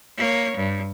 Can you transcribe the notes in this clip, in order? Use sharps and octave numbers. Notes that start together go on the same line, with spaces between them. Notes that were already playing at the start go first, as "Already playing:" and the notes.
A#3 C#5
G2